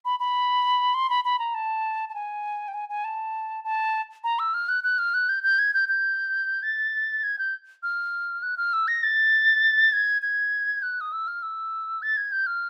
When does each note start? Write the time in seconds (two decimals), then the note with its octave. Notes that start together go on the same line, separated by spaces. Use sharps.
0.05 B5
0.19 B5
0.94 C6
1.10 B5
1.24 B5
1.39 A#5
1.54 A5
2.09 A5
2.14 G#5
2.68 G5
2.74 G#5
2.89 G#5
3.04 A5
3.64 A5
4.24 A#5
4.39 E6
4.54 F6
4.69 F#6
4.84 F#6
4.99 F6
5.14 F#6
5.29 G6
5.43 G6
5.59 G#6
5.74 G6
5.89 G6
6.63 A6
7.23 G#6
7.39 G6
7.83 F6
8.43 F#6
8.57 F6
8.73 E6
8.88 A#6
9.03 A6
9.93 G#6
10.22 G#6
10.83 F#6
11.01 D#6
11.12 E6
11.27 F6
11.43 E6
12.02 A6
12.17 G#6
12.32 G6
12.47 F6